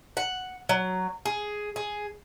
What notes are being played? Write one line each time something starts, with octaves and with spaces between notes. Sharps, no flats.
F#5
F#3
G#4
G#4